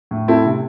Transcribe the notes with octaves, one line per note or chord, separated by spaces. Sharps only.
A2
C4 E4 A4
C3